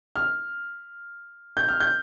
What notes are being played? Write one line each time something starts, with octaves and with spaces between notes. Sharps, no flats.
F6
G6
F6
G6